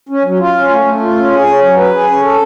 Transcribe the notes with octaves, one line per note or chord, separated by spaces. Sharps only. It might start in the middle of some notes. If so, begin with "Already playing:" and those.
C#4
F#3
F4
C#4
A3
A3
F4
C#4
G#4
C#4
F#3
B4
G#4
C#4
A4